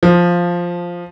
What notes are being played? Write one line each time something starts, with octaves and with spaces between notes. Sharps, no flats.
F3